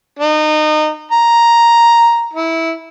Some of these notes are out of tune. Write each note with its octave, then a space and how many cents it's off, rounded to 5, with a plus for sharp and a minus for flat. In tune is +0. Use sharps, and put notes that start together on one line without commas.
D#4 -25
A#5 +5
E4 -15